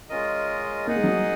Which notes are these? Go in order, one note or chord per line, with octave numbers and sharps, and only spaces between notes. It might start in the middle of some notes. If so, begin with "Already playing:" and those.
G#3 C#4 F4 A#4 D#5
A#3 D#4 G#4 D#5 F#5
G#3
F#3 A#3